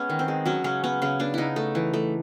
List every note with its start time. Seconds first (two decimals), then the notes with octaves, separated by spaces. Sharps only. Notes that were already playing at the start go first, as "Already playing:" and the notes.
Already playing: G#3 B3 C#4
0.09 D#3
0.19 C4
0.28 G#3
0.46 F#3 C#4
0.64 C#3 C#4
0.84 B3 C#4
1.02 C#3 C#4
1.19 B3 D4
1.34 C#3 D#4 E4
1.56 A3
1.75 E3
1.94 A3